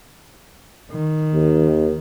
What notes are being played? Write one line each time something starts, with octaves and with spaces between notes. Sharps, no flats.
D#3
D#2